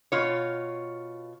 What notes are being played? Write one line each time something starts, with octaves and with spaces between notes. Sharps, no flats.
B2 F4 C#5